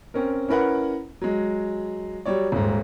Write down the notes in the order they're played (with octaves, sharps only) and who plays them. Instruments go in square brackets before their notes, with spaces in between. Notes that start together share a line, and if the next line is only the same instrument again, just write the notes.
[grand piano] C4 C#4 A#4
C#4 E4 A#4 B4 F#5
F#3 G#3
F#3 G3 C#5 D5
D#1 G#2